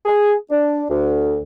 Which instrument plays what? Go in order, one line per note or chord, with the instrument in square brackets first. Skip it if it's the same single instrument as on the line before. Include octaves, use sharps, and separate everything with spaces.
[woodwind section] G#4
D4
D2